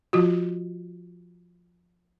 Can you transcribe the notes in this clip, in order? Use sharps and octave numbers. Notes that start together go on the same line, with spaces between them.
F3 F4 F#4